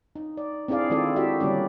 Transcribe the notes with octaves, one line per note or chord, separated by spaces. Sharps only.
D#4
D5
C4 D4 E4 G#4 D5 F5
D#3 G#3 C4 F4 A4 D5
E4 F#4 G4 A4 E5
D3 G3 A#3 C#4 D5